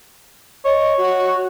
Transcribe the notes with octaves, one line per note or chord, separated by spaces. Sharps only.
C#5 D#5
F#4